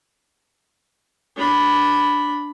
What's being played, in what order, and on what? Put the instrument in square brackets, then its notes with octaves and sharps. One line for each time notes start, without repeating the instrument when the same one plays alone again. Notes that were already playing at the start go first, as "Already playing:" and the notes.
[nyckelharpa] D4 B5